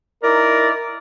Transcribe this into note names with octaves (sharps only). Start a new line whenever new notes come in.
D#4 E4 A#4 D5